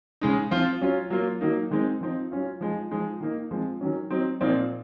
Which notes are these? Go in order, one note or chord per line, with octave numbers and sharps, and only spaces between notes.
C#3 G#3 D#4
F3 C4 F4
F#3 C#4 F4
F#3 A#3 F4
D#3 F#3 A#3 D#4
D#3 G#3 C4 D#4
F3 C4 D#4
F#3 C#4 F4
F3 G#3 D#4
F3 G#3 D#4
D#3 A#3 D#4
F3 G#3 C4
D#3 F#3 C#4
F#3 C4 D#4
A#2 F3 C4 D#4